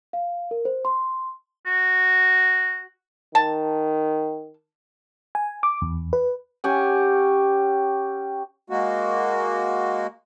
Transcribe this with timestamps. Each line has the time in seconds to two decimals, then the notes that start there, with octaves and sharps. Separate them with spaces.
0.13 F5
0.51 A#4
0.65 C5
0.85 C6
1.66 F#4
3.35 D#3 A5
5.35 G#5
5.63 D6
5.82 E2
6.13 B4
6.64 C#4 G4 F#5 G#5
8.70 G#3 A#3 F#4